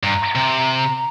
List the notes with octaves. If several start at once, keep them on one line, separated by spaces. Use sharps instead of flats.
G2 A#5
C3